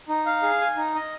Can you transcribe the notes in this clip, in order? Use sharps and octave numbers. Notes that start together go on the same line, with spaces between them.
D#4
F5
G#4
G#5
D#4
D#5